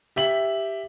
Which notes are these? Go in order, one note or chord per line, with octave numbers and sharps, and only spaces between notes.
G4 E5 F#7